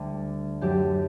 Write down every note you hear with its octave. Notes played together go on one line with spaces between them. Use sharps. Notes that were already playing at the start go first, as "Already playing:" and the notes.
Already playing: D2 D3 G3
F#2 F#3 A3 G4